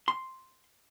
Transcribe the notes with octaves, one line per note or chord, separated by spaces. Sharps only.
C6